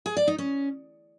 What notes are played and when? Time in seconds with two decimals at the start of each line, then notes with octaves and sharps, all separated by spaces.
0.06 G#4
0.17 D5
0.28 D#4
0.38 C#4